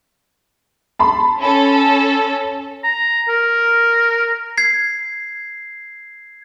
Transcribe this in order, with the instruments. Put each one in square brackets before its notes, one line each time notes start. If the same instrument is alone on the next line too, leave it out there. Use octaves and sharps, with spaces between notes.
[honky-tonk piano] A5 B5 C6
[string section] C#4 A4
[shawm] A#5
A#4
[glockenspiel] G#6 C7